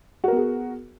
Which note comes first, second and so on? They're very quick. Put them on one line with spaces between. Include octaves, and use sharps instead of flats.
F#4 A#4 B3 G#4